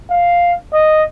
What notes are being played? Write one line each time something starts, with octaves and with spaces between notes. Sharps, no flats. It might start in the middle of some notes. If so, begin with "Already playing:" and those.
F5
D#5